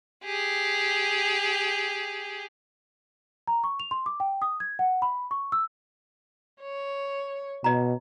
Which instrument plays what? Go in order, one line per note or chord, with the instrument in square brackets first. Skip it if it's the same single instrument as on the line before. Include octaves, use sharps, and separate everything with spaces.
[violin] G4 G#4
[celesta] A#5
C#6
F7
C6
D6
G5
D#6
G#6
F#5
B5
C#6
E6
[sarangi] C#5
[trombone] B2 [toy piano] D#5 A#5